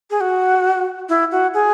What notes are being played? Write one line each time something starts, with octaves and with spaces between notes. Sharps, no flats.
G#4
F#4
E4
F#4
G#4